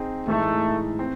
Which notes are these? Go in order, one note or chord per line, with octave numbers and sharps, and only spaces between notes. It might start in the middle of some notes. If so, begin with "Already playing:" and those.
Already playing: C4 D#4 G#4
A2 E3 G#3 A3 D#4
C4